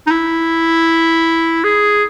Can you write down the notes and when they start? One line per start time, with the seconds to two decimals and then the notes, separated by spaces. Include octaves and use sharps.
0.07 D#4
0.11 E4
1.64 G#4